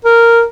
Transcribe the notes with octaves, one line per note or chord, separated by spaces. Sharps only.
A#4